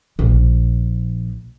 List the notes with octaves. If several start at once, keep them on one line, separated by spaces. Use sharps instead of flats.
A#1